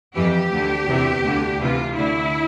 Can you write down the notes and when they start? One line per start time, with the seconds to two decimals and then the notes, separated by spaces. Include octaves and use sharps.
0.14 F2 E3 G4
0.51 D2 D3
0.86 E2 C3 E3
1.23 D2 D3
1.58 D2 C3 E3 F4
1.95 D2 D3 E4